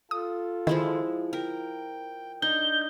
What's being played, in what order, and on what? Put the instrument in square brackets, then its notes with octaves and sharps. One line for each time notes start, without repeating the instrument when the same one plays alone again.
[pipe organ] F4 A4 [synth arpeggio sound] D#6
[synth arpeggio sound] D#3 [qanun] F3 G#3 E4
[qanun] A#4 [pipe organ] G5
[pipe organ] D4 D#5 [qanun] D#4 [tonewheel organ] G6